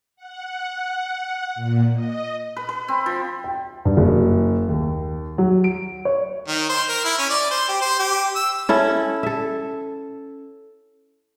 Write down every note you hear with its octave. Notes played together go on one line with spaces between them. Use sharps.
F#5
A#2
D#5
B4
B4
C4
F3
G5
G2
F#1
D#2
F#3
D7
C#5
D#3
C5
A#4
E4
C#4
D5
C5
G4
C5
G4
E6
C#4 E4 A4
A4 E5